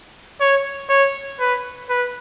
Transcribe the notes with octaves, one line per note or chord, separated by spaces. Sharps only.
C#5
C#5
B4
B4